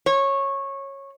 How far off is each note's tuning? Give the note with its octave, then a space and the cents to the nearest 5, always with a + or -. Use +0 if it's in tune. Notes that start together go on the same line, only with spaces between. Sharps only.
C#5 -15